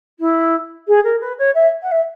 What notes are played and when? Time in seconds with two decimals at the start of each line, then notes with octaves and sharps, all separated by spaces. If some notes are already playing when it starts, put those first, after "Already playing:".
0.19 E4
0.88 G#4
1.04 A#4
1.21 B4
1.38 C#5
1.54 E5
1.82 F#5
1.91 E5